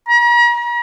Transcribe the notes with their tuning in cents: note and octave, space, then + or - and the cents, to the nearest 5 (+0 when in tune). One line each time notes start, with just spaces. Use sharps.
A#5 +40